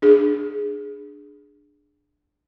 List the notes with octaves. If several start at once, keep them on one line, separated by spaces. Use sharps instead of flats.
D4 G#4